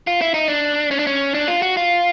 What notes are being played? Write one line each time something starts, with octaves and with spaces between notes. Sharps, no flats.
F4
E4
D#4
D4
C#4
D4
C#4
D4
F4
F#4
F4